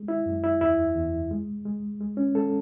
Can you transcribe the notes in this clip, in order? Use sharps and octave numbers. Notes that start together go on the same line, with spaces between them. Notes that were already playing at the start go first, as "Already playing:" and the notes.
Already playing: G#3
E4
F#2
E4
E2 E4
E2
G#3
G#3
G#3
C#4
G#3 A4